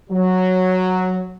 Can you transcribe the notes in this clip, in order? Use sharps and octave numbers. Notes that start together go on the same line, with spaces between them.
F#3